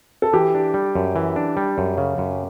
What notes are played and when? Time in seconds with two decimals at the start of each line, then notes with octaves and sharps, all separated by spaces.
0.22 A4
0.33 E3 G4
0.55 D4
0.74 G3
0.95 F#2
1.16 E3
1.36 D4
1.57 G3
1.78 F#2
1.98 C#3
2.18 F#2